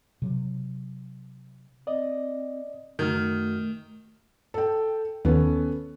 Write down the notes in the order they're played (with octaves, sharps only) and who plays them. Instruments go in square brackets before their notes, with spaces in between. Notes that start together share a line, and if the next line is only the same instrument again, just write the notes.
[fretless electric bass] C3 F#3
[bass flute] C4 [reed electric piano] D5 D#5
[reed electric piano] F#2 F#4 F6 [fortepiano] D#3 [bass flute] A3
[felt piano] A4 G5
[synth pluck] D#2 D#3 [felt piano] B3 C#4 A4